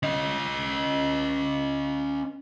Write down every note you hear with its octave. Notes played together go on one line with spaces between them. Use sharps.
C#4 D#5